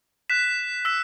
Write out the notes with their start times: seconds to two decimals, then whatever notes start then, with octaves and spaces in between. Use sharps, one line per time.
0.29 F#6 B6 E7
0.85 E6 B6 E7